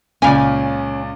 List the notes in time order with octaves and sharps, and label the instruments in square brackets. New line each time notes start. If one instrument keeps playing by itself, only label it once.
[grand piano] C#2 A#2 D5 [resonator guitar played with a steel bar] C#3 G#5 [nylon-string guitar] C#4